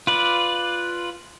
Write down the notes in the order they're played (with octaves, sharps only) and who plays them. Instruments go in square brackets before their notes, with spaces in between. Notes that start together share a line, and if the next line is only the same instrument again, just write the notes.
[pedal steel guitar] F4 B4 D5